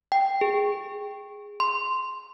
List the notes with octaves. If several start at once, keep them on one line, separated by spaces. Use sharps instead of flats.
G5
G#4
C6